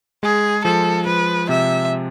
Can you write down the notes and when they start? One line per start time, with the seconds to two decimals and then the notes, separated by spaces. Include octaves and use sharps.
0.23 G#3 G#4
0.65 F3 A4
1.07 F3 B4
1.49 C3 E5